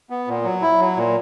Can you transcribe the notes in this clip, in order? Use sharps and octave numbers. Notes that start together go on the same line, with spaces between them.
B3
A#2
F#3
E4
F#3
A#2